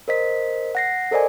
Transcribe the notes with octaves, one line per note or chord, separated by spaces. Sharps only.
A#4 C5 D#5 B6
F#5 A#6 C7
A4 A#4 C5 D5 D#5 G#5